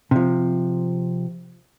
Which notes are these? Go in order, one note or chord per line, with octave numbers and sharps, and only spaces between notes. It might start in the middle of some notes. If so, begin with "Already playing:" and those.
C3 F3